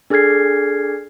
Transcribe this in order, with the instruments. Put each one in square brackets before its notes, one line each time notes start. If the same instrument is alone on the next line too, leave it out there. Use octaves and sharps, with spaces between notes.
[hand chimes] D4 G#4 A4 F6 G#6 C7